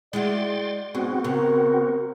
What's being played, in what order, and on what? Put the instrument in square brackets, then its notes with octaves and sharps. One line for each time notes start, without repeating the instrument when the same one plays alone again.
[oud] G#3 E4 F#4 [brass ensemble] D5 [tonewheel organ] G5 C6 A6
[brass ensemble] B1 G#2 B2 [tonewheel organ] B3 C4 F#4 [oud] G#4
[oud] C#3 [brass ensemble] A#4